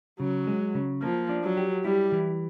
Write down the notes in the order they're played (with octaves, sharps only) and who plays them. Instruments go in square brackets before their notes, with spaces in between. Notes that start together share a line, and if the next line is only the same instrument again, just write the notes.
[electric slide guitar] C#3 [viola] F#3
[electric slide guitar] G#3
C#3
[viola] F3 [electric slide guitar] A#3
[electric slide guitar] D4
[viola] F#3
[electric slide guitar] G4
[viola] G3 [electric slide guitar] E4
[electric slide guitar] E3